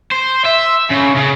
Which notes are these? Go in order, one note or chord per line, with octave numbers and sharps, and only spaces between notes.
C5
E5
C#3
C#3